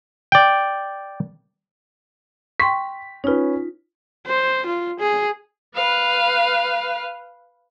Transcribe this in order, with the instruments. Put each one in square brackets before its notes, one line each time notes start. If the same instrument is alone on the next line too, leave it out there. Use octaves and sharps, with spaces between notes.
[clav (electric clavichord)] D5 G5
[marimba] G5 C6 C#6 [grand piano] B6
[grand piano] C#4 B4 [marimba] D#4 F4
[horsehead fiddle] C5
F4
G#4
[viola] B4 F5